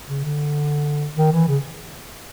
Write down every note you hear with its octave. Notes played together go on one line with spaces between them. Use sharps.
C#3
D3
D#3
E3
C#3